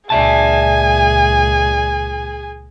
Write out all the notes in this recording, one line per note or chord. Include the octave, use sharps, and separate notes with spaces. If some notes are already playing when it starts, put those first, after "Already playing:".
C#2 A#2 G#4 D5 E5 G#5 A5